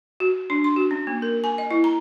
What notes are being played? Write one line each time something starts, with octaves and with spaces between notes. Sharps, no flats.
F#4
D4
C6
F#4
C#4
A#3
A#4
G#5
D#5
E4
A#5